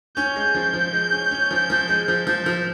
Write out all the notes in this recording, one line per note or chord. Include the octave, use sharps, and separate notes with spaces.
C#4 G6
G#3
F3
F3
G#3
C#4
C#4
F3
F3
G#3
F3
F3
F3